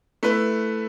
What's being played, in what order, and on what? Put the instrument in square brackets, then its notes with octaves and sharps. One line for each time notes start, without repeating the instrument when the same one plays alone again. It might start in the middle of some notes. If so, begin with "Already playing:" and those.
[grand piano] A3 E4 B4